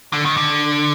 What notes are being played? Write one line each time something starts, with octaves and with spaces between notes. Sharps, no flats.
D3
D#3
D3